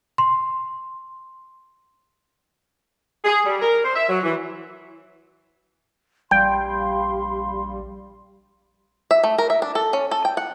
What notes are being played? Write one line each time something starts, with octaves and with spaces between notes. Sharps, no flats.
C6
G#4
G3
A#4
C5
E5
F#3
E3
A#1 G3 F5 G5 B5 C6
E5
A3
A#4
E5
D4
A4
C#4
A4
G5
F#5